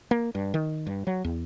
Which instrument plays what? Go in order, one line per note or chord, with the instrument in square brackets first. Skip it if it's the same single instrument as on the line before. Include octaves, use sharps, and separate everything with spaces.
[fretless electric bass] A#3
G2
D#3
G2
F#3
E2